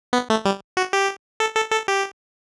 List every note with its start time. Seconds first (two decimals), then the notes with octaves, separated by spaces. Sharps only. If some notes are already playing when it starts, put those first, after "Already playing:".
0.13 B3
0.30 A3
0.45 G3
0.77 F#4
0.93 G4
1.40 A4
1.55 A4
1.72 A4
1.88 G4